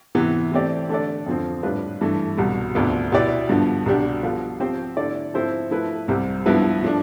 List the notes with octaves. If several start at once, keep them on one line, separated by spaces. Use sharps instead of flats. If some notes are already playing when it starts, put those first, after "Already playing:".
C3 E3 B3
E3 A3 C4 G4 D5
D3 A3 D4 A4 D5
F2 D3 F3 C4
A2 G3 D4 F4 B4
G2 E3 A3
C2 B2 G3
D2 C3 F3 B3 D4
B2 B3 E4 G4 D5
G2 D3 F3 B3
C2 B2 G3 D4 G4
F3 B3 F4 A4
F3 C4 G4 C5
D3 A3 E4 A4 D5
F3 C4 E4 A4 C5
F3 A3 E4 B4
C2 C3 G3 C4
G2 F3 B3 E4 B4
F3 A3 D4